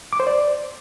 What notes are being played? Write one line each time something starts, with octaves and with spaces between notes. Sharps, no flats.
D6
C5
D5